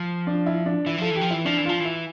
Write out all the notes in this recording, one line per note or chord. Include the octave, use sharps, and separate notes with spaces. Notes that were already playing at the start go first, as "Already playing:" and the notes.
Already playing: F3
D4
E4
D4
E3 E4
F3 A4
E3
G4
F3
E3 E4
F3 D4
E3
F3 F4
E3
E5